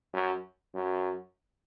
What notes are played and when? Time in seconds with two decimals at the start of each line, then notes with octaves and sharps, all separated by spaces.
0.14 F#2
0.74 F#2